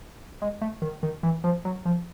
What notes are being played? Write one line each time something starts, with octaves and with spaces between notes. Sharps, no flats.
G#3
A3
D#3
D#3
E3
F3
F#3
F3